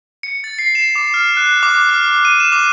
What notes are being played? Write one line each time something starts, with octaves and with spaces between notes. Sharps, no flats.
C#7
A6
C7
E7
D6
F6
F#6
D6
F6
D#7
E7
D6